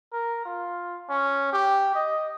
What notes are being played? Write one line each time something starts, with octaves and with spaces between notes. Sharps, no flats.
A#4
F4
C#4
G4
D#5